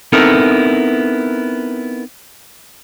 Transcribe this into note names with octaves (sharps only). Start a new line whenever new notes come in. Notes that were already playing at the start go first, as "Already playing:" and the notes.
B3 C4 D#4 E4 A4 A#4